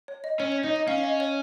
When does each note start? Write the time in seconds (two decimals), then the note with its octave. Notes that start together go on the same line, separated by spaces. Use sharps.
0.08 C#5
0.24 D#5
0.40 C#4 C#5
0.52 C#5
0.63 D#4 D#5
0.76 D#5
0.88 C#4 F5
0.98 F5
1.04 D#5
1.20 C#5